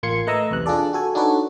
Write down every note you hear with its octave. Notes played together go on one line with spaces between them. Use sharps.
A1 A#3 F4 C6 G#6 C#7
A3 B4 D#5 A#5 D#6 E6
B1 E2 C3 F#6
D4 F4 G#4 A4 D5
F#4 A4 G#5
D4 D#4 F#4 A4 B4 C#5